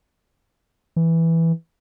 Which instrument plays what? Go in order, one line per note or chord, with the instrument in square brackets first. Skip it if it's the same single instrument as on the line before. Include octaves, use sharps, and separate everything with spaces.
[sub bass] E3